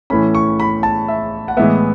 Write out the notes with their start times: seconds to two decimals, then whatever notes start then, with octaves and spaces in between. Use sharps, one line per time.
0.10 A2 E3 A3 C#4 B5
0.35 C#6
0.60 B5
0.83 A5
1.08 E5
1.48 F#5
1.57 A2 E3 G#3 B3 E5